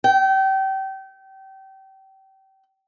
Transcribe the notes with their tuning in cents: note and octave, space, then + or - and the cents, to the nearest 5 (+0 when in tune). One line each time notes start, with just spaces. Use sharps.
G5 -30